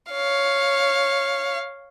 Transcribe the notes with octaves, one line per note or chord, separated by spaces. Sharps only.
C#5 F5